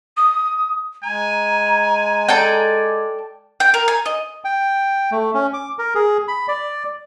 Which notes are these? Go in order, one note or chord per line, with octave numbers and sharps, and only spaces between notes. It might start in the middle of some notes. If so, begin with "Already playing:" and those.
D#6
G#3 G#5 A#5
A4 D5 G5
G5
A#4
G#5
D#5
G5
A3
C#4
D6
A#4
G#4
B5
D5